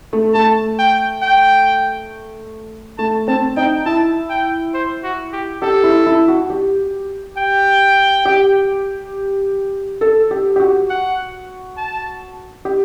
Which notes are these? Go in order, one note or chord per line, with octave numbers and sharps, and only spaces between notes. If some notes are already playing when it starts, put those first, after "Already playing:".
A3
A3 A5
G5
G5
A3 A5
C4 A5
D#4 G5
E4 A5
G5
C5
F#4
G4
G4 A4
E4
E4
F#4
G4
G5
G4
A4
G4
G4
F#4
F#5
A5
G4